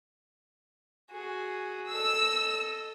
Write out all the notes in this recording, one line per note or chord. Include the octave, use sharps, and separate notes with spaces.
F#4 G#4
A4 D#5 E6